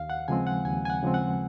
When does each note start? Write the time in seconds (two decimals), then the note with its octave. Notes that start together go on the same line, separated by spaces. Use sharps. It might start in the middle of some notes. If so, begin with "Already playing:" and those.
Already playing: D#2 F5
0.10 F#5
0.28 C#3 F3 G#3 C4 G#5
0.47 F#5
0.65 D#2 G#5
0.85 G#5
0.90 F#5
1.03 C#3 F3 G#3 C4
1.14 F#5